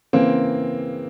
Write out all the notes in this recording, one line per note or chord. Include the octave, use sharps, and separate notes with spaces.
C#3 E3 A#3 C4